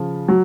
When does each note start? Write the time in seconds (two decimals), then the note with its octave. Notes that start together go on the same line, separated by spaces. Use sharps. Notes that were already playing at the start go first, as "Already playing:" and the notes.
Already playing: C#3 F3
0.28 F#3